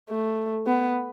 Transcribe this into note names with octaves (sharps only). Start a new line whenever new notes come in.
A3
B3